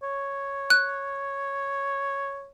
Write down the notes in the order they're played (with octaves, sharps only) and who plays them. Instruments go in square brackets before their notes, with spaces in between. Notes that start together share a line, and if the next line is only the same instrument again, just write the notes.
[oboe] C#5
[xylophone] F#6